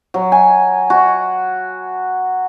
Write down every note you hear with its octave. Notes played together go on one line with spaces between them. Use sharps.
F#3
G#5
F#4